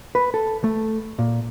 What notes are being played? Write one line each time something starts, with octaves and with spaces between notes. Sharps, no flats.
B4
A4
A3
A#2